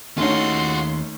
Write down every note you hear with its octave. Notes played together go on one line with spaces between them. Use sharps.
D#2 A3 C#4 D#4 F4 F#4 D#5 C6